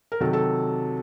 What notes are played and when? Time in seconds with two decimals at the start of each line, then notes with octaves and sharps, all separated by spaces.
0.12 A#4
0.20 C3 D#3 F#3 A4
0.33 A4